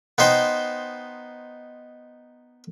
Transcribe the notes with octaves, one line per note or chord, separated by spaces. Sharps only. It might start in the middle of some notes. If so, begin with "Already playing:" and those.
B3 D#4 C5 G5